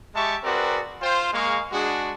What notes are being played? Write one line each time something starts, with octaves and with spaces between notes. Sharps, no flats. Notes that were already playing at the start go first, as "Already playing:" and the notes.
G#3 G4 E5 A5 C#6
C4 F#4 G#4 A#4 B4 D5
F4 C5 G5
G#3 A#3 G#4 F5 C#6
G#3 D4 F#4 G#4